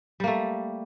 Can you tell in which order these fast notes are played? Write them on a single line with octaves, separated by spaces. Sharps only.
G3 A#3 A3